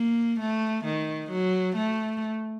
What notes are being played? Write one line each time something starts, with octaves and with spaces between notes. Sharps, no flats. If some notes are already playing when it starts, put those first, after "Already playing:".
Already playing: A#3
A3
D#3
F#3
A3